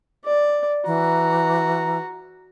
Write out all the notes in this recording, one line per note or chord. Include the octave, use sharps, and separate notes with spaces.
D5
E3 F#4 A#5